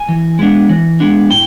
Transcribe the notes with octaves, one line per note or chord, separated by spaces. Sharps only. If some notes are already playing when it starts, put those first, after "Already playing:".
Already playing: G#5
E3
G#3 B3 D4
E3
G#3 B3 D4
A2 G5